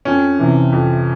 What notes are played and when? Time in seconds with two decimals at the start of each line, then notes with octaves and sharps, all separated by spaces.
0.05 F2 C#4
0.39 C3 E3
0.72 F2